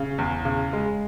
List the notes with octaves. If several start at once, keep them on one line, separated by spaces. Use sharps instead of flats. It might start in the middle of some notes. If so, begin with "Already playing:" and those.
Already playing: C#3
E2
C#3
G#3